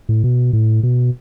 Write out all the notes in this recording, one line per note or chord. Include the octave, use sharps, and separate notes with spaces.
A2
B2
A2
B2